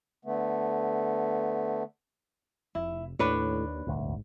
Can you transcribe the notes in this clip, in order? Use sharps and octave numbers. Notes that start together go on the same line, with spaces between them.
D3 A3 B3
F1 E4
D#2 A2 D4 B4 C#5
D#1 G#1 D2